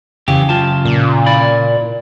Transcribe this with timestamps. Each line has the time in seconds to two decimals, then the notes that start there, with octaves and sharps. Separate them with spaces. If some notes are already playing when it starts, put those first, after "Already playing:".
0.28 C#3 E3 G4
0.49 F#2 F4 A5
0.85 A#2
1.26 E4 D5 B5